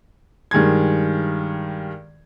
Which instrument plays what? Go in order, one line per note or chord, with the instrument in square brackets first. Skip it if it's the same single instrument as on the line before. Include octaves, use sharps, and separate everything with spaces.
[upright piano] G2 D#3 G#3 G#6